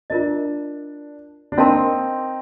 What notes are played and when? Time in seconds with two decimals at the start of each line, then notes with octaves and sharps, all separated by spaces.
0.10 D4 F4 A#4 D#5
1.52 D4
1.58 C4 D#4 A#4 F5 A5 C6